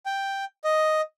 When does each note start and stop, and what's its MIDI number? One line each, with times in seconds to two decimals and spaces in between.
0.06 0.45 79
0.64 1.01 75